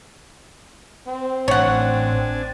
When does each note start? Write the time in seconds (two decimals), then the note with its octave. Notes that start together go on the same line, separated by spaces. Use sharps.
1.07 C4
1.48 A1 D4 C#5 F#5 G#5